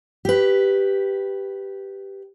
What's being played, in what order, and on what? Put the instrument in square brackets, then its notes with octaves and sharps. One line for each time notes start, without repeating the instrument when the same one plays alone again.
[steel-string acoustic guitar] G4 B4